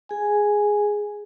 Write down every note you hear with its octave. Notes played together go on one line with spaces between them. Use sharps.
G#4 G#5